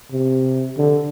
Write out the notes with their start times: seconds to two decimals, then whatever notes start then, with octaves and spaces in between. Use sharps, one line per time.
0.12 C3
0.78 D3